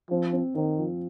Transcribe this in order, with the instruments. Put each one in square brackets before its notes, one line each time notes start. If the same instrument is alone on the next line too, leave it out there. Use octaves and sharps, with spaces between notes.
[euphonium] F3 [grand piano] C4
[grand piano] C4
[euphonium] D#3 [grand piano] C4
[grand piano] F3